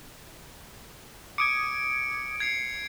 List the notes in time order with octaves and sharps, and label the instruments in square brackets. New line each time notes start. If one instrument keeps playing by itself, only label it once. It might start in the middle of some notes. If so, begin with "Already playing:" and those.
[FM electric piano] D6 D#6 G#6 [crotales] C#7 D7
[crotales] G#6 C7 C#7